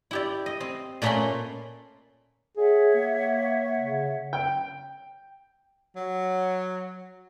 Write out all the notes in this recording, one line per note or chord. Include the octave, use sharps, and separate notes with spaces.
E4 G4 D5
D#5
C4
A#2 A3 A#3 C#4 B5 C6
G#4 C#5 E5 F#5
A#3
C#3
G5
F#3